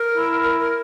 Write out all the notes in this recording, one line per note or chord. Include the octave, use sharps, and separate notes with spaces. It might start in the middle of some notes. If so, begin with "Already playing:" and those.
Already playing: A#4
E4
A#4
A#4